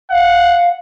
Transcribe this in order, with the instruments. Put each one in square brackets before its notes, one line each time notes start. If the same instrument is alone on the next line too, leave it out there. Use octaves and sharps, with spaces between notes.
[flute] F5 [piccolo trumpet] F#5